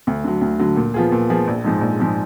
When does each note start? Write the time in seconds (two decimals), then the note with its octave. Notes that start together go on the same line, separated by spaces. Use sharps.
0.07 D2
0.24 D3 F#3
0.41 D2
0.59 D3 F#3
0.76 A#2
0.94 F3 B3 F4 G#4
1.12 A#2
1.30 F3 B3 F4 G#4
1.47 A#1
1.64 G#2 F3 G#3
1.81 A#1
1.99 G#2 F3 G#3